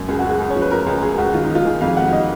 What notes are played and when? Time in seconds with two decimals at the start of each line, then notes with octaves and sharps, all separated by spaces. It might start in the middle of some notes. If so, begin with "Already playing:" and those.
Already playing: F#2
0.08 C#2 G#4
0.19 F#4
0.24 C#2 G#4
0.40 C#2
0.50 C#5
0.56 F3
0.61 B4
0.71 F3 A#4
0.87 C#2
1.02 C#2 G#4
1.18 C#2 F#4
1.34 D#3 F4
1.44 D#4
1.49 D#3
1.55 F4
1.65 D#3 G#4
1.81 F2 F5
1.97 D#3 F#5
2.13 D#5